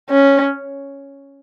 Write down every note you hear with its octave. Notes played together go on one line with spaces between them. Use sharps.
C#4